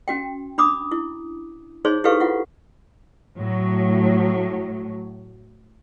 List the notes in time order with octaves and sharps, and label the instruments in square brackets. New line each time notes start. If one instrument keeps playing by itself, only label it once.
[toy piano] C#4 F#4 G5
D4 B5 D6 D#6
E4
D#4 G#4 C5 C#5 C6
E4 G4 A4 B4 F5 C#6
E4 F4 F#5
[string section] A2 F#3